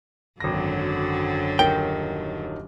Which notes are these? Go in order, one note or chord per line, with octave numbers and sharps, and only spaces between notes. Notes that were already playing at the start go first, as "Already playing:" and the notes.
G#1 F#2 D3 F#3 A#6
D#1 D#3 D#4 G5